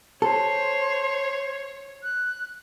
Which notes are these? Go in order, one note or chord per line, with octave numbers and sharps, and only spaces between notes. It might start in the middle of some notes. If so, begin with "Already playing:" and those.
A4 C5 C#5
F#6